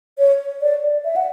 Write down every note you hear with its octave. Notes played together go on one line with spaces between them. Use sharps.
C#5
D5
E5
F#5